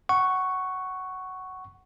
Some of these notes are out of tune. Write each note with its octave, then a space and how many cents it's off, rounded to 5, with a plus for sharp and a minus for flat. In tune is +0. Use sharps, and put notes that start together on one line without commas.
F#5 +15 C#6 +0